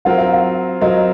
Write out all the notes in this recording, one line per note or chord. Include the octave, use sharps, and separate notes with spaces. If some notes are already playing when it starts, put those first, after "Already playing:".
F#3 C4 F4 A#4 F#5
F5
F#5
F#3 C4 F4 A#4 D#5